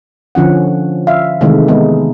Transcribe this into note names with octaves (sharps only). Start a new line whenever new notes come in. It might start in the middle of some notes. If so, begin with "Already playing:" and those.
D3 F3 C#4 F#5
E5 F5
C3 D#3 E3 G#3 A3
G#3 B3 D#4